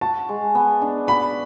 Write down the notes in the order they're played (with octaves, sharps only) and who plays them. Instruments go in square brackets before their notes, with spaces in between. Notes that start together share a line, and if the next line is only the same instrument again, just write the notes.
[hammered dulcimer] F#4 [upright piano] A5
[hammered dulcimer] G#3
B3
D4
[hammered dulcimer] F#4 [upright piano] B5